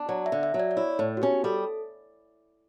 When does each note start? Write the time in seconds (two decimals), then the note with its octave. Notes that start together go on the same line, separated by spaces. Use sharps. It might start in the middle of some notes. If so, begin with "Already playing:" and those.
Already playing: D4
0.09 F#3 D5
0.26 E5
0.32 D3
0.43 E5
0.54 F#3
0.60 D5
0.71 D5
0.77 E4 C#5
0.99 A2
1.17 F#4
1.22 C#4 G4
1.44 G3 A4